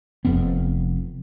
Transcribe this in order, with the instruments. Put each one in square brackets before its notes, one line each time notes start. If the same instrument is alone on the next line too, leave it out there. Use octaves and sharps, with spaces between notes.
[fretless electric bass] F1 F2 B3 C4